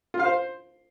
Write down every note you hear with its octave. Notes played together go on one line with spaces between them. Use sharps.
F4
F5
C5